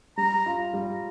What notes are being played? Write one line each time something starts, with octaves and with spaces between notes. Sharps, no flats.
G3 A#5
F4
G3